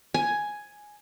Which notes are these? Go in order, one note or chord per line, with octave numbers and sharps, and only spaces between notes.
G#5